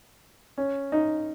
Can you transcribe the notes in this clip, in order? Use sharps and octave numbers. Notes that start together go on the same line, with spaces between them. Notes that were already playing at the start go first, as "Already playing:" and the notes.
C#4
D#4